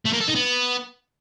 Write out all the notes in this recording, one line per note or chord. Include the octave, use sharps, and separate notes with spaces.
A3
A#3
A4
D#4
B3